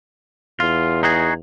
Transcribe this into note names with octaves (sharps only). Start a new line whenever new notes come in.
E2 F4
D#4 F#4 G#4